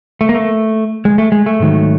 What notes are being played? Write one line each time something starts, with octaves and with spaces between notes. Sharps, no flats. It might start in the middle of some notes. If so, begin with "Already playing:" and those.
A3
A#3
A3
G#3
A3
G#3
A3
G#2 D#3 F#3